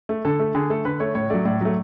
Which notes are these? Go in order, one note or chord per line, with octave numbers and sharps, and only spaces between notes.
A3
D3 A4
A3
D3 G#4
A3 A4
D3 B4
A3 C#5
A2 C#5
F#3 A3 D5
A2 D5
F#3 A3